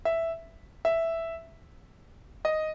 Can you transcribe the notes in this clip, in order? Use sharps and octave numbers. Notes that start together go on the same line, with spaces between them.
E5
E5
D#5